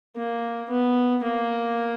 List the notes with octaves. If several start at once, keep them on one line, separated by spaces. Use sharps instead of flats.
A#3
B3
A#3